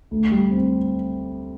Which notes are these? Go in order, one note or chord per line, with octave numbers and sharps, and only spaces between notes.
D2
G3
C4